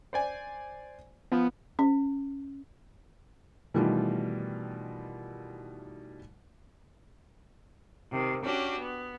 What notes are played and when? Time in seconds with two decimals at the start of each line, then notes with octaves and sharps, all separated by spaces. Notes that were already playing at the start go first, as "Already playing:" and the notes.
0.13 C5 D5 G#5
1.32 F3 B3
1.79 C#4
3.74 B2 D#3 E3 G3 A3 F4
8.11 C3 D#3
8.43 C#4 D4 F#4 G4
8.79 B3